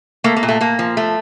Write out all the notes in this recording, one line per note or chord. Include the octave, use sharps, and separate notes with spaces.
A3 A#3
A#3
A#2
A3
A#2 A#3
F3
A3